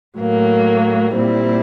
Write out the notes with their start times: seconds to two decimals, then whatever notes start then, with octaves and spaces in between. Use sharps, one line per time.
0.18 A2 F#3 A#3
1.14 A#2 G3 C4 E4